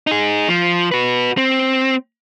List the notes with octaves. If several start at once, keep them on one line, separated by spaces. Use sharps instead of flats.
D#4 G#4
F3
F#4 B4
C4